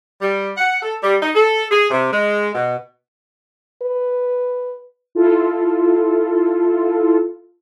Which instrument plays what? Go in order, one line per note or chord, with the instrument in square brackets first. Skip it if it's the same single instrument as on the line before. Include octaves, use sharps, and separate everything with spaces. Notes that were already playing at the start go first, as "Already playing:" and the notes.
[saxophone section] G3
F#5
A4
G3
D#4
A4
G#4
C3
G#3
B2
[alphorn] B4
[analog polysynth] E4 F4 A4